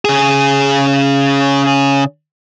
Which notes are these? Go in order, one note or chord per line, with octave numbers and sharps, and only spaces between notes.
C#3 G#4